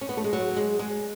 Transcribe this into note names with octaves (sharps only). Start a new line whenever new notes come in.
C#4
B3
A3
G#3
F#3
G#3
G#3